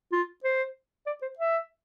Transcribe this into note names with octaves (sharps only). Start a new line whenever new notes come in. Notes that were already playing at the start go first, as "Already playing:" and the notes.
F4
C5
D5
C5
E5